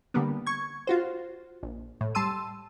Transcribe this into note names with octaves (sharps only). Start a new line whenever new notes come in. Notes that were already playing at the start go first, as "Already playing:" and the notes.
D3 G3 A#3 B3
C#6 G#6
F4 F#4 C5
A#1
A2
G3 A5 C6 E6 D#7